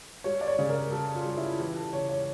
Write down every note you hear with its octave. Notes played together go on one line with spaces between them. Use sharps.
G3 C#5
D5
C#5
C#3
A#4
G3 A4
F4
G3
E4
E3 G4
A4
C#3 C#5
C#5